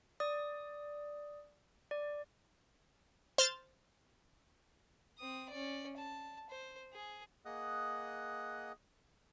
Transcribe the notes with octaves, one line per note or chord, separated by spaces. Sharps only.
D5 D#6
D5
C5 F6 G6 A6 E7
C4 D#6
C#4 D5
A5
C5
G#4
A#3 G#4 D#5 F#5 D#6 F#6